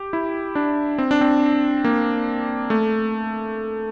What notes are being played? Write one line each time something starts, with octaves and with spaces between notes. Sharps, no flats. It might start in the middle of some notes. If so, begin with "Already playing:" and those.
Already playing: G4
E4
D4
C4
D4
C4
A#3
A3